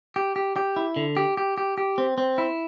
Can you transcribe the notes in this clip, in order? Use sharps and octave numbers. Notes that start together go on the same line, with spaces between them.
G4
G4
G4
E4
D3
G4
G4
G4
G4
C4
C4
E4